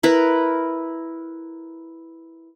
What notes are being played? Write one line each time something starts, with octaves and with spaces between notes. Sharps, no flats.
E4 A#4 B4